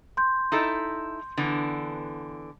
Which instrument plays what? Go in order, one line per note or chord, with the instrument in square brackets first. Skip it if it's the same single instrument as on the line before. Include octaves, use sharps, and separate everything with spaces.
[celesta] C6 G6
[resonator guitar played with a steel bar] D#4 E4 A4
D3 E3 B3